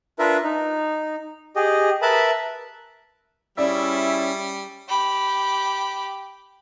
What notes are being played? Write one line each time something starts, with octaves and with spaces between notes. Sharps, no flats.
D4 F4 A#4 B4 E5
D#4
G4 G#4 D#5
A#4 B4 E5 A5 B5
G3 C#4 E4 G#4 D5 E5
G4 B5